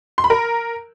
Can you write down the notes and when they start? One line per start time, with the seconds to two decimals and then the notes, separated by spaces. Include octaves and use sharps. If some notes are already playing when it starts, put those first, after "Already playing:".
0.18 C6
0.24 B5
0.30 A#4